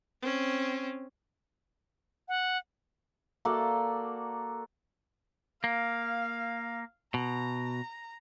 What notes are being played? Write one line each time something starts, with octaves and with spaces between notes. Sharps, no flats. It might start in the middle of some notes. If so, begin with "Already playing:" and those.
C4 C#4
F#5
A#3 F#4 A4 D5
A#3 F5
B2 A#5